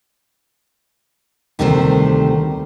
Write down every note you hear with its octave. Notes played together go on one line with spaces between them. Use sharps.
D2 C3 D#3 G3 A3 C5